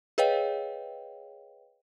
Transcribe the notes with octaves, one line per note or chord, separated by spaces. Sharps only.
G#4 B4 C#5 D#5 F5 G5